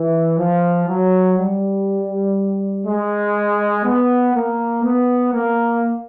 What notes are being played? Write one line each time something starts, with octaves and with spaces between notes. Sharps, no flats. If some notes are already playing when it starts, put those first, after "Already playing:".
Already playing: E3
F3
F#3
G3
G#3
B3
A#3
B3
A#3